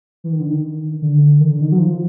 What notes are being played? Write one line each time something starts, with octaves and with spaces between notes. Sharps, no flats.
E3
D#3
D3
D#3
D3
D#3
D3
D#3
F#3
F3